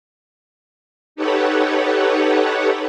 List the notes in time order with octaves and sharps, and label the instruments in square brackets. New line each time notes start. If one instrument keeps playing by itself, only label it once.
[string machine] D#4 G4 A4 B4 C#5 F#5